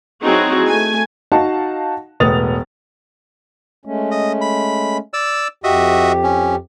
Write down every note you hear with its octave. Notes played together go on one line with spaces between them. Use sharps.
F#3 C4 D#4 E4 F#4 G#4
A3 G#5
D#4 F#4 F5 F#5 A5
E1 A2 B3 D#6 A6 F7
G#3 A3 C#4
D#5
B5
D5 E6
F2 F#4 G4 D#5 E5
C#4